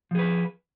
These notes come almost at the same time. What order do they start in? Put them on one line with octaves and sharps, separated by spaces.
F3 G#4 B4